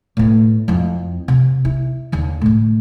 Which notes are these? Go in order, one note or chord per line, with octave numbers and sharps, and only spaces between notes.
A2 B3
F2 E4
C3
E4
D#2 D3
A2 A3